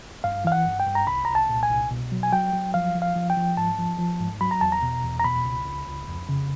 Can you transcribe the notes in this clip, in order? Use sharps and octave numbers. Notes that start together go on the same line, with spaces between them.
G2 F5
E3 F5
F#5
G2
G5
G2
A#5
C2 B5
C2 A#5
A5
A#2
G#5
C2
B2
F#3
G#5
F#3 G5
F#3
F3 F5
F3
F5
F3
G5
F3
G#2 A5
F3
F3
G#2
F#3 B5
A#5
E2 A5
A#5
B2
E2
A#5
B2 B5
C#2
C#2
C#2
F2
C#3